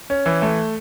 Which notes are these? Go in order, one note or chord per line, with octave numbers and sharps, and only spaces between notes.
C#4
E3
A3